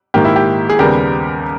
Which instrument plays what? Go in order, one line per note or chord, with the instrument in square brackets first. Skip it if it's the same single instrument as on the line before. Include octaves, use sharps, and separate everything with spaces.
[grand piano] G#2 D#3 A#3 G4
E4
G4
G#4
D#2 C#3 G3 B3 G4 A#4